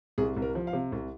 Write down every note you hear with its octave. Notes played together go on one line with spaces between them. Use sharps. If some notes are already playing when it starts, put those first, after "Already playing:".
C2 G#4
C2
A#4
F3
F5
C3
C2